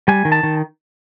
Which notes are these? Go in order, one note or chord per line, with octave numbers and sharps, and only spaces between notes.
G3 G#5
D#3
A5
D#3